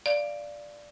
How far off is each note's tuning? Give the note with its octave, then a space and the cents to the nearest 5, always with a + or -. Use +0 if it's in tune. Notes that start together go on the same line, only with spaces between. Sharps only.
D5 +0 F5 -15